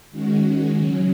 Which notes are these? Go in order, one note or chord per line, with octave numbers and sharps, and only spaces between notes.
D#3 G#3 C#4 F#4
C#3 F#3 C#4